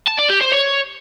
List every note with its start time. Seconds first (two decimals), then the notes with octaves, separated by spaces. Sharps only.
0.07 A5
0.19 D5
0.30 G4
0.41 C5
0.52 C#5